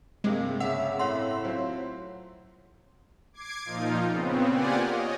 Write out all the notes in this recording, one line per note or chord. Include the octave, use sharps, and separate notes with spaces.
G2 C3 G#3 A#3
C#3 E5 F#5
A2 C#5 F#5 C6
F#3 C4 F4
D6 G#6 C7 D7
A#2 F3 D#4 F4
C#3 B3 C4
A#3 F4 G4 D5 F#5 G#5
C#5 D#5